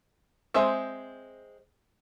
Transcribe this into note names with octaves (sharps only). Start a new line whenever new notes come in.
G#3 C4 G#4 C5 E5